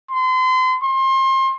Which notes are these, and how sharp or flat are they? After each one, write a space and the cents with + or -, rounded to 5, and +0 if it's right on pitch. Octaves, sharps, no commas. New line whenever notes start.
C6 -35
C6 +30